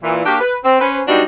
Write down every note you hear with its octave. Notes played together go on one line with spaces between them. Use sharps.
A#2 E3
A#3 D4 F#4 G4
B4
C4
C#4 B4 C5
F#3 G3 B3 D4 D#4 F#4